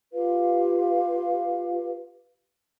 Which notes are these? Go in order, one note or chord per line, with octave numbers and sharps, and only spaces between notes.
F4 G4 B4 F5